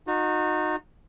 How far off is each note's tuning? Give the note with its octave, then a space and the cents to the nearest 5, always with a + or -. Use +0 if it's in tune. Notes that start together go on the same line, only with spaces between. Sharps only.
D#4 -10 F#4 -30